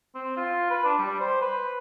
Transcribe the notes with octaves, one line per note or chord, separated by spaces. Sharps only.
C4
F4
B4
D4
G3
C5
B4